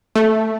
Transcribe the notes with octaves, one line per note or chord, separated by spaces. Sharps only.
A3